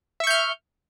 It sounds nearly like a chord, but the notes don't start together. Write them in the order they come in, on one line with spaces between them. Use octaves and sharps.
E5 C#6 G6 F6